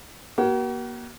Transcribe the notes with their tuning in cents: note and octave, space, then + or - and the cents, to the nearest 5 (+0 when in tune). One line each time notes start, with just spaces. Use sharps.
A#3 +35 F#4 +45